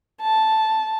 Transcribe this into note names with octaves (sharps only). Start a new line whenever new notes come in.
A5